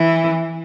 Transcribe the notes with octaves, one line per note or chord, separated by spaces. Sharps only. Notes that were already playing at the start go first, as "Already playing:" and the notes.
Already playing: E3